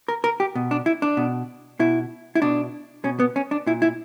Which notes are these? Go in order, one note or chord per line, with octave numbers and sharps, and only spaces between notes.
A#4
A#4
G4
B2
D4
E4
D4
B2
B2 E4
E4
B2 D4
B2 C#4
B3
C#4
D4
A#2 E4
E4